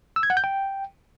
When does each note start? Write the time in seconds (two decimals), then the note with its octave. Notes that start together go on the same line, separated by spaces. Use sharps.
0.16 E6
0.23 G#6
0.30 F#5
0.37 G6
0.44 G5